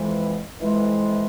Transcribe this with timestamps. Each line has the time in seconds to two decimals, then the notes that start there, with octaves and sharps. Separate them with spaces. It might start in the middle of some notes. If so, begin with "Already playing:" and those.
Already playing: F2 E3 G#3
0.59 F2 E3 G#3